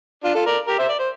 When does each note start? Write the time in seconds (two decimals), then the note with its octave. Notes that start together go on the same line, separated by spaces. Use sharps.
0.24 D4 F4
0.35 F4 A4
0.46 A#4 D5
0.67 G4 A#4
0.78 C5 E5
0.89 D5
0.99 C5